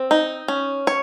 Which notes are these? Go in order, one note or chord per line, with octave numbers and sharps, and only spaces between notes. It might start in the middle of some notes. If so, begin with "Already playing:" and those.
Already playing: C4
D#4
C#4
C#5